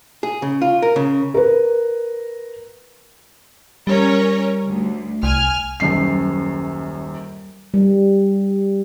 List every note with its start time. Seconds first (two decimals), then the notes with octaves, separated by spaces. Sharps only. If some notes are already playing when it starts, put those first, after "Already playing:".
0.23 G#4
0.42 C#3
0.62 F4
0.82 A#4
0.96 C#3
1.34 A#4 B4
3.87 G3 C#4 A#4 C#5
4.67 D2
5.23 C2 G#5 F6
5.80 D#1 F#2 C7
7.74 G3